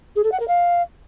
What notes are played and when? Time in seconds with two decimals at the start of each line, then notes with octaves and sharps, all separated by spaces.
0.16 G#4
0.24 A4
0.32 F#5
0.40 A#4
0.48 F5